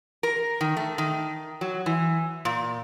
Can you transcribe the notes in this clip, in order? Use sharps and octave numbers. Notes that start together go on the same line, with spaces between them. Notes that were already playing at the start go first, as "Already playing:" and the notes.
A#4
D#3
A3
D#3
F#3
E3
A#2